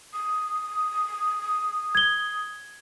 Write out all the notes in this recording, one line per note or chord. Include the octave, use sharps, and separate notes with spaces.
D#6
G#6 G7